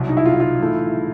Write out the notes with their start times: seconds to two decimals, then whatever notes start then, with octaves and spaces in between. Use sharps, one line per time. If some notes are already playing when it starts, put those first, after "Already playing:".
Already playing: C2 B2 F#3
0.09 D#4
0.17 E4
0.26 F4
0.34 E4
0.40 F4
0.60 A2 E3 A3